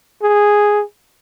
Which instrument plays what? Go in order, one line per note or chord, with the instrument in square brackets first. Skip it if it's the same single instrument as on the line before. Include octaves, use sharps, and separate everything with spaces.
[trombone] G#4